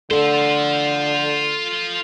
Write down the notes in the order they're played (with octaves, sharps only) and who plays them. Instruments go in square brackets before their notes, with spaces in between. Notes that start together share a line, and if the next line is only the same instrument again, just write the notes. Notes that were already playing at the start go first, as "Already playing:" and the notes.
[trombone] D3 [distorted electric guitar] F4 C5 [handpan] A4